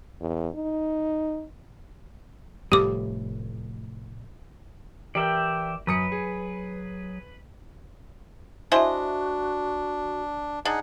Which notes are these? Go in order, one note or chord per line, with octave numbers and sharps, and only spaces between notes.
E2
D#4
F1 A2 G3 G4 D6
E3 G4 A#4 D5 E5 G5 F#7
F#2 F#3 B4 D#6 C#7
G#4
D4 E4 F#4 C5 D#5 E5 G#5
D4 D#4 G#4 F#5